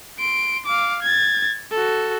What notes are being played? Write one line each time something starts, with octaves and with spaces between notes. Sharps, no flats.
C6 D7
F5 D6
G#6 A6
F#4 A4